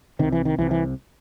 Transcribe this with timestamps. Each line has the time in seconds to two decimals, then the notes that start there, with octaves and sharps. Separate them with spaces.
0.19 C2 C3 D#3
0.32 E3
0.45 D#3
0.58 C2 C3 E3
0.71 E3